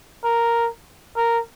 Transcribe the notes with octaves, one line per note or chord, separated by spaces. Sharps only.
A#4
A#4